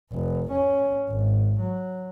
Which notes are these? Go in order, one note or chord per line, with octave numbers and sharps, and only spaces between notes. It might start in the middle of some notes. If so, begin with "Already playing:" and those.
F1
C#4
G#1
F#3